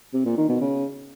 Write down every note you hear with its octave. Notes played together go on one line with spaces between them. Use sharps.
C3
A#2
D#3
B2
C#3